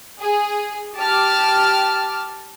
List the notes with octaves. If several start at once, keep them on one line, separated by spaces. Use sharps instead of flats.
G#4
G4 A5 D6 F6